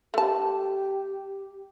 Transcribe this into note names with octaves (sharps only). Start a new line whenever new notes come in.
A3 G4 A5